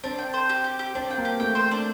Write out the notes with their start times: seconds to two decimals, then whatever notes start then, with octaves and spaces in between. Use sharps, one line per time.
0.04 C4 D4
0.18 G5
0.34 C5
0.49 G4
0.64 G4
0.79 G4
0.95 C4 D4
1.10 G5
1.18 A#3
1.25 G4
1.40 A3 G5
1.55 C5
1.71 D4